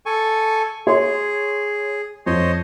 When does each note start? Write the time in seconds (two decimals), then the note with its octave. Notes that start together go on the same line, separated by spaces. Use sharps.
0.06 A4 G#5 C#6
0.87 G#4 C#5 C6
2.26 F2 C5 C#5 D#5